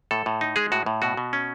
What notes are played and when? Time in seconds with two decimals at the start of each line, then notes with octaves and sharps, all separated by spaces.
0.11 A2 A4
0.26 A2
0.41 D#4
0.56 G#3 G#4
0.72 A2 F#4
0.86 A2
1.02 B2 F#4
1.17 B2
1.33 C#4